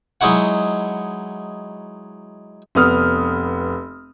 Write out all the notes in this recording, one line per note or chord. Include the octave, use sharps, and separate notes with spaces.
F#3 G#3 D#4 E4 F#4 F#5
F1 B3 D#6 F6